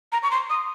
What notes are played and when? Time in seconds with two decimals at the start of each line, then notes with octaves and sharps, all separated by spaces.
0.12 A#5
0.23 C#6
0.31 C6
0.50 D#6